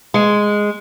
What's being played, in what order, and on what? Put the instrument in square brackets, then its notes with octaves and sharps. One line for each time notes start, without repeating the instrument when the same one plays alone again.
[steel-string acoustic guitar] G#3